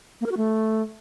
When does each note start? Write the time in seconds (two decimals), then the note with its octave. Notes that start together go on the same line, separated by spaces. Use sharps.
0.21 A#3
0.26 A#4
0.32 F#4
0.37 A3